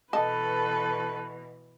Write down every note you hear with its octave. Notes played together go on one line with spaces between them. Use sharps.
B2 E3 A4 B4 D#5 A5